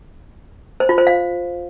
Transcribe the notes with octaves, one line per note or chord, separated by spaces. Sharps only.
C5
F4
C5
F5